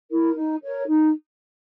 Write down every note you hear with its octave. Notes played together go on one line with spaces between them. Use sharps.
E4 A#4
D#4
A#4 C#5
D#4